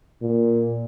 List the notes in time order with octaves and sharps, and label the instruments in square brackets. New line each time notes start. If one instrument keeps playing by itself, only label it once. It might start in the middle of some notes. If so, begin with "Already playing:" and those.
[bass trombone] A#2